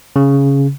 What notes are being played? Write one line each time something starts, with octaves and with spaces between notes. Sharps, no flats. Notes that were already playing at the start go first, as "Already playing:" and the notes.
C#3